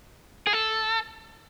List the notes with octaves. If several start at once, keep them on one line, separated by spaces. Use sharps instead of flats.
G#4
A4